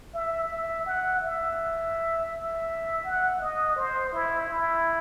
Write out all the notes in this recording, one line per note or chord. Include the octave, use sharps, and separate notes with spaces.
E5
E5
F#5
E5
E5
F#5
D#5
C5
E4
E4